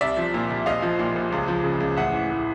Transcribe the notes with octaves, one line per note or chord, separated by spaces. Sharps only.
C2 D5 E5
F3
A#2
C2
A#1 D#5 F5
F3
A#2
A#1
C#2
F3
C#3
C#2
A1 E5 F#5
E3
A2